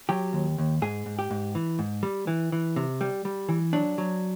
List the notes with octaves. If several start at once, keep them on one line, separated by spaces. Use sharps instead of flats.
F#3 G4
D#2
D#2
G#2 G#4
G#2
G4
G#2
E3
G#2
G3
E3
E3
C3
G3
G3
E3
F#3 D4
F#3